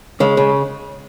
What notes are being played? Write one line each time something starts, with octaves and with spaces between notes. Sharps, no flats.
C#3 G#3
C#3